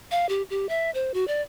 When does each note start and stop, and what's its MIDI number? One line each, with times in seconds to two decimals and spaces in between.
0.11 0.28 77
0.29 0.42 67
0.50 0.67 67
0.69 0.91 76
0.94 1.12 72
1.14 1.25 66
1.28 1.42 74